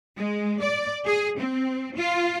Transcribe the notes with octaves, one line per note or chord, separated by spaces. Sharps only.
G#3
D5
G#4
C4
F4